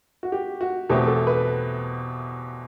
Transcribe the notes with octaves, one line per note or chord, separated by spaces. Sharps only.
F#4
G4
F#4
E2 B2 A3 C4 G4
A4
B4